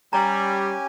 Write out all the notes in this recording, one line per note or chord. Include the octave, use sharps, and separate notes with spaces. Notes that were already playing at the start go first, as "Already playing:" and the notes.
G3 C#4 G4 G#5 A#5